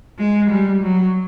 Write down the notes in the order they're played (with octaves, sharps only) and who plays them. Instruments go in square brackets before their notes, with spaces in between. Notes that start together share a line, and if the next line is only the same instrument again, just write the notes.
[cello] G#3
G3
F#3